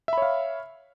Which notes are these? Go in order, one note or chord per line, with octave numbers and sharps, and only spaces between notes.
C#5 E5 F5 B5